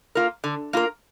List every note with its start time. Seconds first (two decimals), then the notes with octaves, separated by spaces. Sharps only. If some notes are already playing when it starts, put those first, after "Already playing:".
0.15 A#3 F4 A#4
0.44 D3
0.73 A#3 F4 A#4